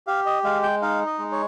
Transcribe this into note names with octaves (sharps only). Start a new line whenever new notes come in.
G4 F5
D#5
G#3 F5
G5
D#4 F5
D#5
G#3
C#5